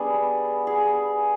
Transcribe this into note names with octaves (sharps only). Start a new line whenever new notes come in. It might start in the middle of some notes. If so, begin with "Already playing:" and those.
Already playing: G3 B3 D4 G#4
G#4